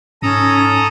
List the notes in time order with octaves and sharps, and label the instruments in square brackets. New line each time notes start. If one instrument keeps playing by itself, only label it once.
[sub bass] G#2 [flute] C#4 [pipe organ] A4 A#5 D#6